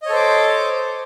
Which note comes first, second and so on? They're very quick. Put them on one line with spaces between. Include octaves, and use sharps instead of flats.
D#5 C#5 A4 C5 D6